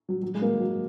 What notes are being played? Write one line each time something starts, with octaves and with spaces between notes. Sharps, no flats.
F#3
F#3
G#3
A#3
F#3